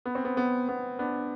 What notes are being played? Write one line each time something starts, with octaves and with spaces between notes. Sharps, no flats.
B3
C4
B3
B3
B3
B3 D4